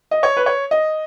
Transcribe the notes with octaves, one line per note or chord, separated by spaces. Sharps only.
D#5
C#5
B4
C#5
D#5